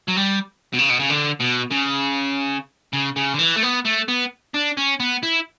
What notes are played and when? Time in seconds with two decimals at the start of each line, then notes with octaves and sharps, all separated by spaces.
0.08 F#3
0.17 G3
0.73 B2
0.78 C#3
0.90 B2
0.99 C#3
1.09 D3
1.40 B2
1.71 C#3
2.93 C#3
3.16 C#3
3.34 D3
3.39 E3
3.56 A3
3.63 B3
3.85 A3
4.08 B3
4.54 D4
4.77 C#4
5.00 B3
5.23 E4